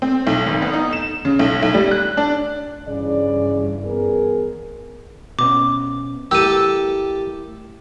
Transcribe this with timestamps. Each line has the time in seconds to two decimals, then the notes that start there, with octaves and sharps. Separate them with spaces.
0.02 C4
0.27 B1
0.47 G#1
0.62 B3
0.73 D#4
0.93 E7
1.25 C#3
1.39 B1
1.63 B1
1.74 G3
1.91 F#6
2.17 D4
2.87 G2 C#3 E3 D5
3.84 B3 G#4 A#4
5.39 B2 B3 C#4 D6
6.31 A3 E4 G4 A4 A#4 E6 D#7